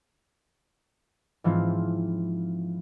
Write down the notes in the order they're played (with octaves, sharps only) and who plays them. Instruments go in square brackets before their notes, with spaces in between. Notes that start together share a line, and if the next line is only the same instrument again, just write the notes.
[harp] G#2 E3 F3 C4 F4